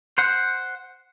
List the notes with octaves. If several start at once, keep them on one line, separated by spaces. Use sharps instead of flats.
C5 F#5